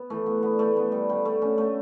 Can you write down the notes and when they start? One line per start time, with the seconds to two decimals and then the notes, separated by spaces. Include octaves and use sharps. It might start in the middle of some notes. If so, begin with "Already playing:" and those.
Already playing: B3
0.10 E3 A3
0.26 B3
0.43 D3 B3
0.59 A3
0.76 D3 B3
0.92 G3
1.09 D3 G3
1.25 A3
1.42 D3 C#4
1.58 A3